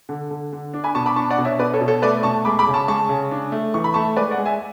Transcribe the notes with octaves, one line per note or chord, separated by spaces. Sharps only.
D3
D3
D3
D4
G#5 B5
B2 A5 C#6
B5 D6
D4 A5 C#6
D5 F#5
B2
C#5 E5
B2 B4 D5
A4 C#5
B2
A4 C#5
A3 B4 D5
B2 A5 C#6
G#3 B5 D6
B5 D6
C#3
A5 C#6
G#3 A5 C#6
C#3
D4
A3
E3 C#6
B5
A3 A5 C#6
G#3 B4 D5
D5 F#5
G#3
E5 G#5